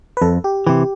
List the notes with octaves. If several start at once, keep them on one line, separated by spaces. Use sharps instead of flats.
B4
F2 A4
G4
C3 E3 G4